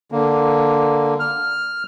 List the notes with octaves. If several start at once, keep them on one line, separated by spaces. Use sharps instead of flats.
D3 A#3
F6